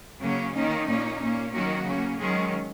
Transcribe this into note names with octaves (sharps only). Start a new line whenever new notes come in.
C#3 F#3 A#3 C#4
D#3 A#3 C#4 D#4
A#2 A#3 C#4
A#2 A#3 C#4
D#3 F#3 A#3 C#4 F#4
C#3 A#3 C#4
D#3 F#3 G#3 C#4 G#4